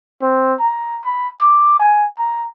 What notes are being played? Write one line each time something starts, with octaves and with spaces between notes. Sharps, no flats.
C4
A#5
B5
D6
G#5
A#5